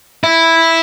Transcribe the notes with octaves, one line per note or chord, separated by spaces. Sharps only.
E4